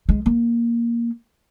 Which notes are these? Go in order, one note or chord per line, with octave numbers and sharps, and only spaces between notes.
G#3
A#3